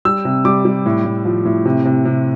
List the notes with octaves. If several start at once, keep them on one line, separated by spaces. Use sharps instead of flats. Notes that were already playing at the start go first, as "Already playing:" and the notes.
G3 E6
C3
G3 D6
G3
A2
A2
F3
A2
C3
C3
C3